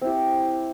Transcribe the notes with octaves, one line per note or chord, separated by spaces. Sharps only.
C4 E4 G4